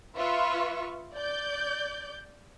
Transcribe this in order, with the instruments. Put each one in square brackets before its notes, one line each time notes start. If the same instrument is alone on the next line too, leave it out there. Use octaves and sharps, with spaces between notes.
[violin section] F4 B4 E5 C#6
D5 G6